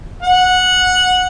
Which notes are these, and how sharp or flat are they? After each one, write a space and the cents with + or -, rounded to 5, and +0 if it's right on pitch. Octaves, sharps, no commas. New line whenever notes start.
F#5 -10